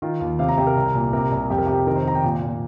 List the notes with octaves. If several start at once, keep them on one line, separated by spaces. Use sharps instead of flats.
D#3 F4
D#2
C3 F5
A#5
C3 G4
A#4
C2
A#2
C3 A#4
C2
F2 G4
A#4
C3 G4
D#3 A#4
C5
D#3 A#5
G5
A#2
A#2